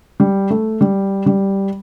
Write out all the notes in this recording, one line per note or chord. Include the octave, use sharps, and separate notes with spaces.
G3
A3
G3
G3